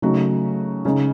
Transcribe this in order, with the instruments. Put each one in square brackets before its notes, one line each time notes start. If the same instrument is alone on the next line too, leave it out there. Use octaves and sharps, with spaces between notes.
[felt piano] C#3 F#3 A3 D#4 F#4
C#3 G#3 D#4